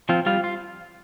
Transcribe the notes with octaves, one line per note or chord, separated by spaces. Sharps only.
F3 C4 F4
G3 F4
F4